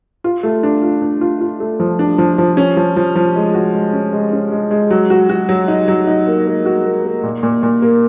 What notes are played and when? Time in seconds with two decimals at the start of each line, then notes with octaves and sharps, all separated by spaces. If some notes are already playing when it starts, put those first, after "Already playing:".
0.24 F4
0.43 A3
0.63 D4
0.82 F4
1.02 D4
1.21 F4
1.41 F4
1.60 A3
1.80 F3
1.99 D4
2.18 F3
2.38 F3
2.57 C#4
2.77 F3
2.96 F3
3.15 F3
3.36 G#3
3.54 F#4
3.74 G#3
3.93 C#4
4.13 G#3
4.33 C#4
4.52 G#3
4.71 G#3
4.91 F#3
5.10 F#4
5.29 F#4
5.49 F#3
5.68 D#4
5.88 F#3
6.07 D#4
6.26 A#3
6.46 A#3
6.66 F#4
6.84 A#3
7.04 A#3
7.23 A#2
7.43 A#2
7.63 A#2
7.82 A#3